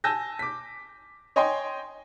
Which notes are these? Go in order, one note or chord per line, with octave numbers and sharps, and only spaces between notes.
G#5 A5 E6 G6 A#6
D6 B6
C#5 D#5 G5 G#5 C6